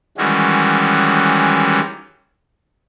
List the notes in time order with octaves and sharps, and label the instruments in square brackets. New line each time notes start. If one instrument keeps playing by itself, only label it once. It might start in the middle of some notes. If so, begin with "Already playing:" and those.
[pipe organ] D#3 E3 G3 G#3 C#4 F#4